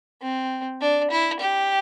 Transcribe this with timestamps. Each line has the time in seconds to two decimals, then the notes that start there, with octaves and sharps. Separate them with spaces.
0.22 C4
0.81 D4
1.11 E4
1.40 G4